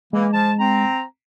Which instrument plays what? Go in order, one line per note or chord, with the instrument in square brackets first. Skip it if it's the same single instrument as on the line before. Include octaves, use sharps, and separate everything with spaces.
[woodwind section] E3 A#3 [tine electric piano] G#3
[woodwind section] F3 A5
C4 A#5